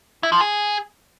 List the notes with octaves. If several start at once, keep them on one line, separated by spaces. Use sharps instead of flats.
E4
F3
G#4